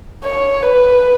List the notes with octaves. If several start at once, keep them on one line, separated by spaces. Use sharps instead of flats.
C#5
B4